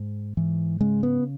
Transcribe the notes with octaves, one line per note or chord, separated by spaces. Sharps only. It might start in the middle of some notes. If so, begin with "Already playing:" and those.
Already playing: G#2
G#2 E3
C#3 G#3
B3